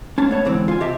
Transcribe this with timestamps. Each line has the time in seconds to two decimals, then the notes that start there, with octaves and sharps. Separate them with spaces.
0.18 C#4 A5
0.29 A3 B3 C#5 A5
0.45 G#2 D3 E3 C4
0.68 F4 G#5
0.80 C3 F4 G4 D#5 E5 A5